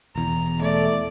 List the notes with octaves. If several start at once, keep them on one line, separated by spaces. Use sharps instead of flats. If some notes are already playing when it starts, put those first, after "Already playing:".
E1 E2 A#5
A3 D5